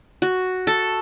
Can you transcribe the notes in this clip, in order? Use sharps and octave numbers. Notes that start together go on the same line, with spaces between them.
F#4
A4